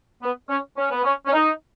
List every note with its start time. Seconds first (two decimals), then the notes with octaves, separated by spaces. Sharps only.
0.22 B3
0.49 C#4
0.77 C#4
0.91 B3
1.04 C#4
1.26 C#4
1.33 D#4